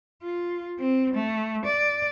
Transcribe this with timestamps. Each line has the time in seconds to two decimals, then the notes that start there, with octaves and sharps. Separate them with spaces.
0.23 F4
0.79 C4
1.14 A3
1.65 D5